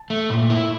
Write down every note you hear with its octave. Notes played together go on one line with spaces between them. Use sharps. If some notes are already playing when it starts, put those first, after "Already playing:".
Already playing: A5
A3
A#2
E4